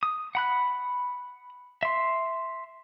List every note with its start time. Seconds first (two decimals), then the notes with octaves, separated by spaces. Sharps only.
0.03 D#6
0.35 F#5 B5 F#6
1.83 E5 C6